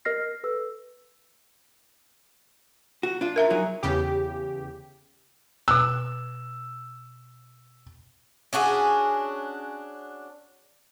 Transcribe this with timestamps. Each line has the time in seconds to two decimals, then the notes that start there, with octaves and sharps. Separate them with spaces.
0.05 A#4 D#5 F6 A#6 C7
0.44 A4 B4 E6
3.03 F#4
3.21 D4 F4
3.36 A#4 E5 A#5
3.50 F#3 D#4 G#4
3.83 E2 C#3 G4
5.68 B2 E6 F#6
8.53 C#4 D4 F#4 G#4